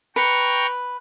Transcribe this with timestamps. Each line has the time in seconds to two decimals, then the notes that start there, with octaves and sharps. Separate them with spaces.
0.16 B4 G5 A#5 C#6